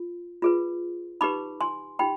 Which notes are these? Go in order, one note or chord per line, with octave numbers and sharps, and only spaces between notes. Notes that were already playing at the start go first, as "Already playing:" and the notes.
Already playing: F4
F4 G#4 B4
D#4 G4 B4 B5 D6
G#5 C6
D#4 G4 G5 B5